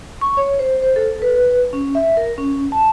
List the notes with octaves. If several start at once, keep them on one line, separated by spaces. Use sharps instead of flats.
C#6
C#5
C5
C5
A4
B4
C#4
E5
A#4
C#4
A5